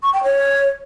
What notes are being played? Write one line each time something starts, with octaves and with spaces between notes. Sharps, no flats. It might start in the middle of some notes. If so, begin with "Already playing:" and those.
C#6
G5
C#5